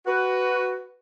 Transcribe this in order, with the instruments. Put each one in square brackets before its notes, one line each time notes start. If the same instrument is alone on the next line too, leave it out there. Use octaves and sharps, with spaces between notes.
[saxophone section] F#4 B4